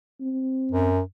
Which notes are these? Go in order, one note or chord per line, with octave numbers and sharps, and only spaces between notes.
C4
F#2